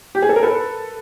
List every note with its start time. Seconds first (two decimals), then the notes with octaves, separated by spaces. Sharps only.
0.15 G4
0.22 G#4
0.29 A4
0.36 A#4
0.43 A4 B4